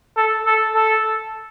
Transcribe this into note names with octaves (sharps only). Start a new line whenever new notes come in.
A4
A4
A4